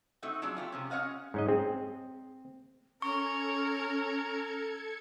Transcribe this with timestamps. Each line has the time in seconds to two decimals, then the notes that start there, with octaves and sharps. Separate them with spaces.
0.22 A3 C4 D#4 F#4
0.42 F3 F#3 D4 G#4 D5
0.57 A3 F4 G4
0.72 C3 F3 C#4
0.90 C#4 C#5 D#5 F5 F#5
1.34 G#2 C#4 D#5
1.48 C4 G#4
3.02 C#4 A4 A#4 C#6 G#6 C#7